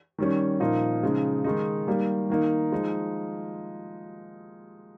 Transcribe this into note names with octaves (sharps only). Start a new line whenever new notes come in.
D#3 G3 C#4
A#2 F3 A#3 D#4
C#3 F3 G#3 D#4
D#3 G#3 D#4
D#3 G3 A#3
D#3 A#3 D#4
F3 G#3 D#4